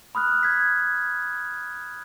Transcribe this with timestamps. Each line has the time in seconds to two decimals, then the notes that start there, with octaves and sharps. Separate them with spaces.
0.15 B5 D#6 F6 F#6
0.43 G#6 B6